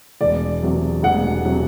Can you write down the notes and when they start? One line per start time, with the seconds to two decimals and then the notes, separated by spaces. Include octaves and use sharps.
0.21 E1 D5
0.62 E2 C3 F#3
1.03 E1 F#5
1.45 C3 F#3